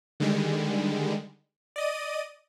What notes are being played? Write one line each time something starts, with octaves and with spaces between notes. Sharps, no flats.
D3 D#3 G3 G#3
D5 D#5 D#7